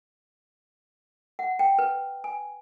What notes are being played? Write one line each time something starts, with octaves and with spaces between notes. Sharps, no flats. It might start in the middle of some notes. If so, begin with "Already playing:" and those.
F#5
G5
B4
G#5